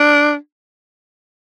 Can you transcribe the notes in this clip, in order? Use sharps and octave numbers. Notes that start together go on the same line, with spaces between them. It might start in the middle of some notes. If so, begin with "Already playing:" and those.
Already playing: D4